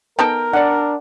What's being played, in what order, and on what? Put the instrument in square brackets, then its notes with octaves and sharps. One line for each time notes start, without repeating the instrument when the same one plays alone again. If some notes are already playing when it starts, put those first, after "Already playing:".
[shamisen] B3 D#4 A4 [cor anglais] A#4 [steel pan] G5
[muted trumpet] D4 [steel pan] D5 F#5